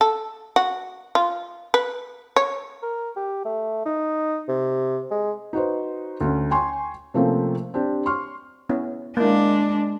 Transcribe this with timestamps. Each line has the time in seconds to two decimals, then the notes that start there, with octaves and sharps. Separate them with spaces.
0.01 A4
0.56 F#4
1.15 F4
1.74 B4
2.36 C#5
2.82 A#4
3.16 G4
3.45 A3
3.86 D#4
4.48 C3
5.11 G#3
5.53 D#4 F#4 B4 C5
6.21 D2 C#4
6.51 G5 G#5 C6 C#6
7.14 C3 F3 A3 A#3 C4 C#4
7.74 C4 D4 G4
8.06 C6 C#6 F6
8.69 B3 C#4 E4
9.17 G#3 A#3 D4 E4